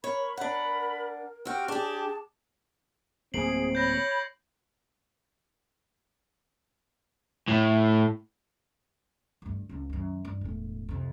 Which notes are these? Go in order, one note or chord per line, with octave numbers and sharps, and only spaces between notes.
A#4 C#5 B5
D4 F#5 B5
C4 F#4 G4 G5 F6
D4 G4 G#4 A5 D6
D1 A#3 C4 G#4 C7 D7 F#7
C#5 B5 G6 A#6
A2
D2 G2
C#2 D3
F#2 D#3
G2
E1 A2
F2 C3